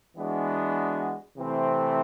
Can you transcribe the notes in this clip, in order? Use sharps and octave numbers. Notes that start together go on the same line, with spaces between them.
E3 G#3 B3 D4 F#4
C3 E3 A3 C4